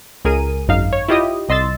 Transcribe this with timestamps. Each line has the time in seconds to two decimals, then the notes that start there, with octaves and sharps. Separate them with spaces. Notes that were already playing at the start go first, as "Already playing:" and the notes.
0.25 C#2 G#4 A#4 D#7
0.68 G#1 F#2 D#4 F5
0.93 C#5
1.08 E4 F4 G4 D#5 D#6
1.49 C2 D#5 C6 E6 A6